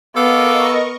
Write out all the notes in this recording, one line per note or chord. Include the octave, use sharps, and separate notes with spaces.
B3 A4 A#4 D#5 F5 C#6 D6